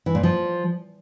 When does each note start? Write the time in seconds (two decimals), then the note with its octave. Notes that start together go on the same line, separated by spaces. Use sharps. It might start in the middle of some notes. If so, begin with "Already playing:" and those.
0.06 E3
0.15 A#2
0.23 F3